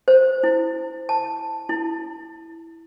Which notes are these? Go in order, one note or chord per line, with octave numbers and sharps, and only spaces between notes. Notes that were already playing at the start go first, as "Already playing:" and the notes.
C5
E4
A5
E4